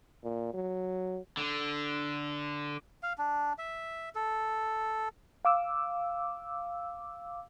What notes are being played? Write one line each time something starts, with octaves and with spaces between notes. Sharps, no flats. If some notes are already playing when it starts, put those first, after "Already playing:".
A#2
F#3
D3
F5
D4
E5
A4
F5 D6 E6